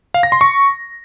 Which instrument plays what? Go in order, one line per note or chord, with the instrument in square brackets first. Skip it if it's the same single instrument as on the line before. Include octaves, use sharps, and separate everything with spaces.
[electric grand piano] F5
A#6
C6
C#6